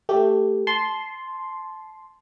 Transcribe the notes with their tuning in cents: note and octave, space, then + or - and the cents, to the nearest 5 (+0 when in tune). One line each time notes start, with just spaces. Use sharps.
A3 +10 G4 +0
A5 -20 C6 +0